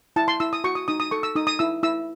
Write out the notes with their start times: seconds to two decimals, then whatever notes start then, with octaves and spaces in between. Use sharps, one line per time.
0.16 E4 A5
0.28 C6
0.40 E4 E6
0.53 D#6
0.64 F#4 C#6
0.75 D#6
0.88 D#4 D#6
1.00 D#6
1.11 A4 C#6
1.23 E6
1.36 D#4 D#6
1.47 D#6
1.59 E4 E6
1.83 E4 E6